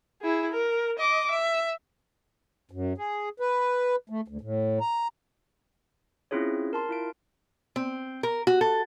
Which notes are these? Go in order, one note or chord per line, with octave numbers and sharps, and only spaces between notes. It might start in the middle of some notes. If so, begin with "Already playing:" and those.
E4 G#4
A#4
D#5 D6
E5
F#2
G#4
B4
A3
D2
A2
A#5
C4 C#4 E4 F4 G#4 C#5
A#4 A5 C6
E4 F4 D7
C4
A#4
F#4
A4